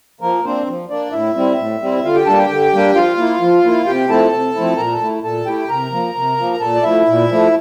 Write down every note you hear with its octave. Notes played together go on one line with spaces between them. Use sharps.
F3 A#3 A#4
A#3 C4 D4 C5
F3
A#3 D4 D5
A2 E4 E5
G3 C4 E4
A2
G3 C4 E4
D3 F4 F5
G4 G5
G3 A#3 D4 A4 A5
G4 G5
D3
G3 A#3 D4
F3 F4 F5
A#3 E4
F3
A#3 E4
C3 G4 G5
F3 A3 C4 E4 A4 A5
C3
F3 A3 C4 E4
A#2 A#4 A#5
A4 A5
A3 E4
A#2 A4 A5
A3 E4 G4 G5
C3 A#4 A#5
F3 A#3
C3
F3 A#3
A#5
A#2 A4 A5
D5
F3 A3 E4 E5
A#2
F3 A3